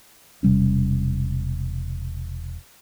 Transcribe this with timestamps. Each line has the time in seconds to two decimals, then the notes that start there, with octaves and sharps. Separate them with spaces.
0.43 E1 C3 G3 C#4